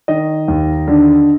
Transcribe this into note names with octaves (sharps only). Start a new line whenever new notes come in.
D#3 D#5
D#2
D3